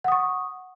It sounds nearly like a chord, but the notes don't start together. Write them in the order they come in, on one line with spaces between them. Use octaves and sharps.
F#5 D#6 C#6